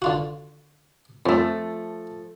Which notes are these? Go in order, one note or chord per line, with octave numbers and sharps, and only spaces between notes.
D3 F4 F#4
F2 F3 A3